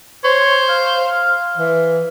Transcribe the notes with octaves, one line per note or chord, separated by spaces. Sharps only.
C5 C#5
F5
E3